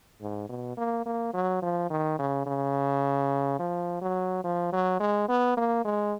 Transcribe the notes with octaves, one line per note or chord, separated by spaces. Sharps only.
G#2
B2
A#3
A#3
F#3
F3
D#3
C#3
C#3
F3
F#3
F3
F#3
G#3
B3
A#3
G#3